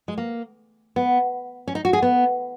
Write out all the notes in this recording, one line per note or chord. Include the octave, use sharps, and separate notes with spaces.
G#3
A#3
B3
C#4
D#4
F#4
G#4
B3